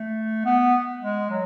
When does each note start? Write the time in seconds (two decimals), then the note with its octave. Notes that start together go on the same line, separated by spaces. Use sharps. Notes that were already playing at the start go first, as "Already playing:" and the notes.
Already playing: A3
0.45 B3
1.02 G#3
1.30 F#3